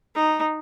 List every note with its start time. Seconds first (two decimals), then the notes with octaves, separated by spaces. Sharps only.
0.15 D#4